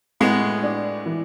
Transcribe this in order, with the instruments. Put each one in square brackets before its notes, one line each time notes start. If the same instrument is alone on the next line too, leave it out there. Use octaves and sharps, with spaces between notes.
[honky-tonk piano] A2 [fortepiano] G#3 B3
[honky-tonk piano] D4
E3